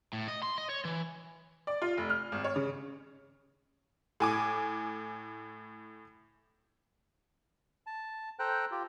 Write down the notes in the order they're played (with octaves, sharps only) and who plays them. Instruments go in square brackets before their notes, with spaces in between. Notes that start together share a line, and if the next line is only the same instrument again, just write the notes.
[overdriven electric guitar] A2
D#5
C6
D#5
C#5
E3
[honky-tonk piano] D5
F4
F1
F6
G#1
C#5
C#3
A2 G#5 D6
[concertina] A5
A4 C5 G5 A#5 F#6
F4 G4